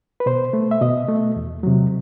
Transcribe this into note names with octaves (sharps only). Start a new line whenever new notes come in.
B4
B2 C5
A3
E5
B2 D#5
A3
E2
C3 F#3